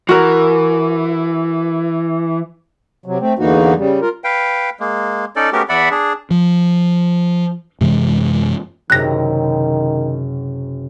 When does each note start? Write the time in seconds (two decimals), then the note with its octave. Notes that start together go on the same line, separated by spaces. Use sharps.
0.09 E3 F#4 A#4
3.06 C3 F#3
3.20 A3 C4
3.39 E2 D3 E3 A#3 D#4 F#4
3.76 C#3 G3
4.01 F4 A#4
4.24 B4 F5 G5
4.80 G#3 A#3
5.36 C#4 D#4 A4 D5
5.53 A3 B3 C#4 F#4 G4 A#4
5.69 E2 D5 E5 F#5 B5
5.91 D4 G#4
6.31 F3
7.81 F#2 C3 E3 G#3
8.90 F#1 F#2 C3 D#3 F#6 A#6